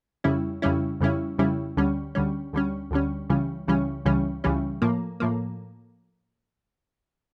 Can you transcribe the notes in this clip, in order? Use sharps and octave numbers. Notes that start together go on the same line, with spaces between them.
F2 C#3 G3 C#4 E4
F2 C#3 G3 C#4 E4
F2 C#3 G3 C#4 E4
F2 C#3 G3 C#4 E4
D2 D3 G3 C#4
D2 D3 G3 C#4
D2 D3 G3 C#4
D2 D3 G3 C#4
C#2 C#3 E3 G3 C#4
C#2 C#3 E3 G3 C#4
C#2 C#3 E3 G3 C#4
C#2 C#3 E3 G3 C#4
A2 F3 A#3
A2 F3 A#3